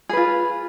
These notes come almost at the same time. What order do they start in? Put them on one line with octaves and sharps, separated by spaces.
G#4 B4 F4